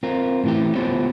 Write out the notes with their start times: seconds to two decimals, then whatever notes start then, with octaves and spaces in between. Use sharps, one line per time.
0.03 C4 F4 A#4
0.44 A2 E3 G4
0.75 B3 F4 G4 C5 C#5